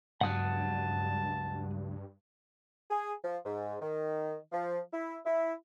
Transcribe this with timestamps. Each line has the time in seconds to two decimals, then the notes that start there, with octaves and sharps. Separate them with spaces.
0.21 C#2 G2 F#3 F#5 A5 D#6 F#6
2.90 G#4
3.23 F3
3.45 G#2
3.81 D#3
4.52 F3
4.92 E4
5.26 E4